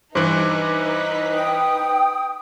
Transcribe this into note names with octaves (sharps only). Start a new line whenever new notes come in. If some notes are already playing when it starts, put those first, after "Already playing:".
G2 E3 D#4 B4 C5 D6 F#6
G5 D#6